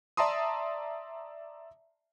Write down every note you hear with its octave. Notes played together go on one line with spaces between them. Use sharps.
D5 E5 A5 A#5 C6 D#6